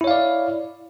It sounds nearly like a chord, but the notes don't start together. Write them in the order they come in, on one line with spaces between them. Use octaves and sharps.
E4 C#5 F5 D5